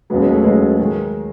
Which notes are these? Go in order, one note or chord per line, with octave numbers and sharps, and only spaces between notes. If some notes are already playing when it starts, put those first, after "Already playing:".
D#2 C#3 F#3 G#3 B3
G#3 B3
A3
D#2 C#3 F#3 G#3
D#3 G#3